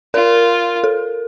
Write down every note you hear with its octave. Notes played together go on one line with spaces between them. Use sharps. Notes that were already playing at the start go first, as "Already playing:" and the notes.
F4 A#4
A4